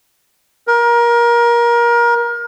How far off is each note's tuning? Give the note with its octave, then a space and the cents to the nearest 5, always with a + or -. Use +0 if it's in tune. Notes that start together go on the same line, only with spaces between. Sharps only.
A#4 +25